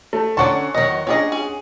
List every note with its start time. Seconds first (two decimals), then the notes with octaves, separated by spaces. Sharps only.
0.13 A3
0.37 D3 F#3 C#4 D5 F#5 A5 C6 C#6
0.74 E2 D#3 F#3 D#5
1.07 F#3 C#4 D4 G#4 D#5
1.32 G#4